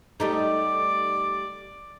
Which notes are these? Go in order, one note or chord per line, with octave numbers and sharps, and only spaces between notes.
G3 A3 D#4 D5